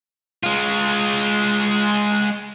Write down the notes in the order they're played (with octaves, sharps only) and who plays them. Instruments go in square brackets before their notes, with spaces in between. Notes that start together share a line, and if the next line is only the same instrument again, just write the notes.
[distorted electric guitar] G#3 F4